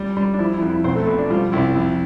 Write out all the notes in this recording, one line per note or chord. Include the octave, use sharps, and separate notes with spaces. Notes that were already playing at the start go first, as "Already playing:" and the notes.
Already playing: G3
G3
D4
F3 E4
E4
F2
E4
B1 C4 C5
A3 A4
B2
D4
F3 G3 F4
C2 E4
F2 E4